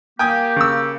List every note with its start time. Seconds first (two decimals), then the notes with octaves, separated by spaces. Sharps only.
0.19 A#3 G4 G5 G#5 D#6
0.56 C#3 E6